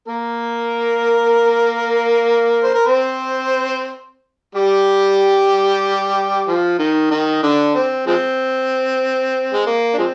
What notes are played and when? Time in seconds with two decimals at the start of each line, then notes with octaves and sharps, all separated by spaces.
0.08 A#3 A#4
2.63 C5
2.75 A#4
2.85 C4 C5
4.55 G3 G4
6.47 F3 F4
6.79 D#3 D#4
7.11 D#3 D#4
7.43 D3 D4
7.75 C4
8.07 F3 G#3 C4
9.53 G#3
9.66 A#3
9.94 D4
9.98 F3 G#3 C4